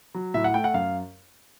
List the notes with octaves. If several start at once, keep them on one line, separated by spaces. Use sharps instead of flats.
F#3
A2 E5
F#5
A3 G5
F#5
F#2 F5